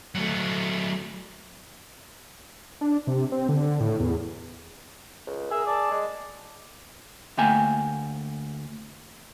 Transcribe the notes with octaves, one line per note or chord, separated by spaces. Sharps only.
F#3 A3
D4
C3
C4
D3
A2
E2
C#2
G#4 A#4 E5
D5 A5
G#3
D2 A3 A#3 G5 G#5 A#5